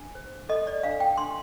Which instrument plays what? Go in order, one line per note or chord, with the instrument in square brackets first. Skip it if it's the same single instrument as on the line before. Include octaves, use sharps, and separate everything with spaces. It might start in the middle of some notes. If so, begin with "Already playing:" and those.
Already playing: [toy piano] D4
C5
A4 D#5
D5
D4 F5
G5
D4 C6